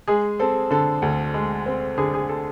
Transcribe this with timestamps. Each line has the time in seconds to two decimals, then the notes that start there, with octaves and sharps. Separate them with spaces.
0.07 G#3 G#4
0.39 C4 A4
0.71 D3 A4
1.02 D2
1.34 G#3
1.66 C4
1.98 D3 G#4
2.14 G#4
2.29 A4